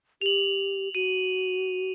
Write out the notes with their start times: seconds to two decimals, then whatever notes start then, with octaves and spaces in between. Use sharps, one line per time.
0.21 G4 F7 F#7
0.95 F#4 D#7